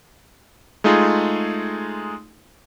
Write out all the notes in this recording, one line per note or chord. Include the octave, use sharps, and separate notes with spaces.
G#3 A3 D#4 F4 G#4